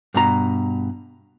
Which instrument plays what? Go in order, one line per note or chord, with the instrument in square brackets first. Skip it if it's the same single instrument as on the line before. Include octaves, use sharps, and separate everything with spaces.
[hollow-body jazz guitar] G2 B2 A#5